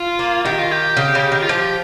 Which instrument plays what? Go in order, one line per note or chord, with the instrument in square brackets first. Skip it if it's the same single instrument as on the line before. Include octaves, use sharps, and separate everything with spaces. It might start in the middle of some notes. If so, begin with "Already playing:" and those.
Already playing: [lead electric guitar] F4
[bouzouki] A#3
[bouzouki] D#3 [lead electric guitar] G4
[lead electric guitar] F4
G4
[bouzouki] C#3
C#3
D#3
[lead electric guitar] F4
[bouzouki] F3 [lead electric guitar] G4